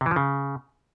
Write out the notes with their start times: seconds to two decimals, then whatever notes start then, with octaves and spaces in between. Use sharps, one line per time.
0.01 C3
0.06 E3
0.11 F3
0.16 C#3